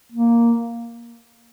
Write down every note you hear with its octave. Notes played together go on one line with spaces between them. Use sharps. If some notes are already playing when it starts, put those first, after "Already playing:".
A#3